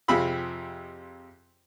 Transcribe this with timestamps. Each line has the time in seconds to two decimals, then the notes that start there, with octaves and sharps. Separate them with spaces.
0.08 F2 C3 F4 G#4 B5 E6